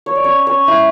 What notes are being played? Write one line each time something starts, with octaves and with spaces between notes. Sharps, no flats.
C#5
D5
C#4 C#5
C#4 C#5
E4 E5